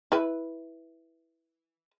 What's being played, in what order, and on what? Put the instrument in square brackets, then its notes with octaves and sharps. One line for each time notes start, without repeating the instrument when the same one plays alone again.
[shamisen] E4 B4